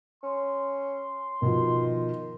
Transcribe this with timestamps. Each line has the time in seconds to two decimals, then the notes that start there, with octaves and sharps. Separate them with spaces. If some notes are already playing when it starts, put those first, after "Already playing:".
0.23 C#4 C6
1.42 B2 D#3 F3